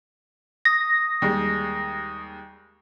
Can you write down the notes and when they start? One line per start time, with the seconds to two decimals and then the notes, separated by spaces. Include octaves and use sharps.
0.65 D#6 A#6
1.22 D#2 G3 G#3